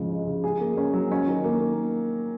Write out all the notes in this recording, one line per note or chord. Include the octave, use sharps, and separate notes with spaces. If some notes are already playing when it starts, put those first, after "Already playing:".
Already playing: G#2 C#3 F3
G#3
C#3
G#4
A#3
C#4
F#3
C#4
D#3
A#3